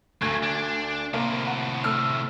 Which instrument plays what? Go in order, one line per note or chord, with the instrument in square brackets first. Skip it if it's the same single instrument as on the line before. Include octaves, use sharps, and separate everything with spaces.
[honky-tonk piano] D2 G#6 [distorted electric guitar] A3 A#3
[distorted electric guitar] D4
[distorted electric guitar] A2 C3 [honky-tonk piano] A#3
[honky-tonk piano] F#5
A3 E6 F6